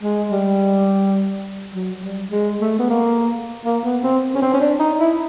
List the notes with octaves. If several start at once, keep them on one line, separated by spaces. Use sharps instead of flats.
G#3
G3
F#3
G3
G#3
A3
B3
A#3
A#3
B3
C4
C#4
C4
C#4
D4
D#4
E4